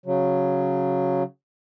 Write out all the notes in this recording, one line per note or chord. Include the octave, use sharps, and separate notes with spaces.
C#3 F#3